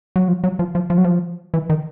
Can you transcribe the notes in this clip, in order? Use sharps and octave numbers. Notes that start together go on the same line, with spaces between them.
F#3
F3
F#3
F3
F3
F3
F#3
F3
E3
D#3